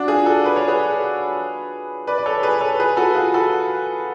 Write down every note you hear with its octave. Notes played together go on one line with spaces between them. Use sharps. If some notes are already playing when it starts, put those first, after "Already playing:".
Already playing: D4 F#4
F4 G#4
F#4 A4
B4
C#5
G#4 B4
B4 D5
D5
A4 C#5
G#4 B4
A4 C#5
G#4 B4
F#4 A4
F4 G#4
F#4 A4